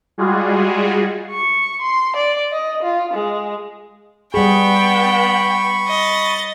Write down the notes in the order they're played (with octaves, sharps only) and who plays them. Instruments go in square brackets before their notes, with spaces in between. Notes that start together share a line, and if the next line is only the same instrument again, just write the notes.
[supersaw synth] G3 G#3 F4 F#4 G#4
[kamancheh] C#6
C6
D5
D#5
F4
G#3
[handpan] G3 G#4 [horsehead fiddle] B3 [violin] G5 [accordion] B5 C#6
[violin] D#5 A6